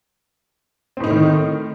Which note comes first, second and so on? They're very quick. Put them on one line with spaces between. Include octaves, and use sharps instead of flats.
C4 A2 D#4 A3 D#3